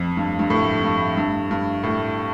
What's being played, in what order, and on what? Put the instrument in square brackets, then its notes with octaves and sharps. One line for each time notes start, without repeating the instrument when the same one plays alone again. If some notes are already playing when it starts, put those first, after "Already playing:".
Already playing: [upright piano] F2
G2
G2
A2
G2
G2
G2
A2